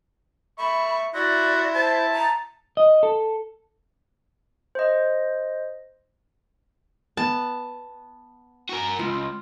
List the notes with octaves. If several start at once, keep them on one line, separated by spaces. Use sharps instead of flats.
E5 B5 C#6
E4 F#4 D5 E5 C6
C5 A5
A#5
D#5
A4
C5 D#5
B3 A5
F#4 A#4
C#2 F4